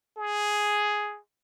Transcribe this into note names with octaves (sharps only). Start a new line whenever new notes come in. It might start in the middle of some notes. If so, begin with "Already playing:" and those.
G#4